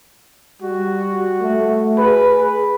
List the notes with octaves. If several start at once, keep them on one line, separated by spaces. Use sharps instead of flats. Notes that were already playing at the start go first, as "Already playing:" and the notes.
G3 F#4
A3
G#4 B4